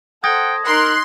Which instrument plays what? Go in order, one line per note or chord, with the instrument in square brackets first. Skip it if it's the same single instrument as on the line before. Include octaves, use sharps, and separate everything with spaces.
[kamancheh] A4 C5 [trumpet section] F#5 G5 [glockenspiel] D#6 G#6 A#6
[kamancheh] D#4 F#6 [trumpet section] A#4 [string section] C6